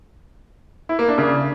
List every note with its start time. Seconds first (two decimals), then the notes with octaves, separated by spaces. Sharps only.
0.89 E4
0.99 A#3
1.08 D4
1.18 C#3